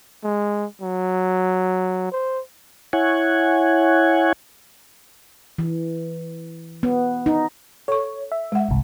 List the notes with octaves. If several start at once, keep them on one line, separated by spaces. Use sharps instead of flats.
G#3
F#3
C5
E4 C#5 F#5 G#5
E3
B3
D#4
A4 C#5 C#6
E5
G#3 F#5
G1 C2